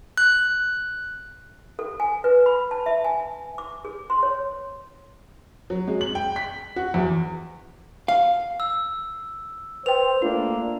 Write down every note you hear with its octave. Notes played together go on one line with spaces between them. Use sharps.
F#6
A4
G#5
B4
B5
A5
E5
G#5
D6
G#4
C6
C#5
F#3
G#3
F#7
G5
B6
F#4
E2
F5
E6
B4 C5 G5 F7
A3 A#3 D4 F4